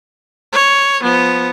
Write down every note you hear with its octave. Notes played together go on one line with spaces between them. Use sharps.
C#5
F3 B3